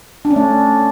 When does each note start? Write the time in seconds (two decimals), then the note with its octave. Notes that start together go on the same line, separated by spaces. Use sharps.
0.25 D4
0.31 C#4
0.36 A3